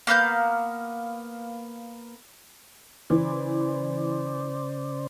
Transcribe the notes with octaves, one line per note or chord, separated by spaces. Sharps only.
A#3 B3 F5 G6
C#3 E3 C5 D5